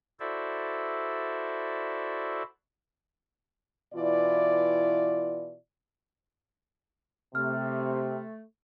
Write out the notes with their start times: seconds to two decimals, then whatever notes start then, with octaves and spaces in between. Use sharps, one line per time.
0.20 E4 F#4 A4 C5 D5 E5
3.94 B2 E3 E4 F4 D5
7.35 C3 A3 F6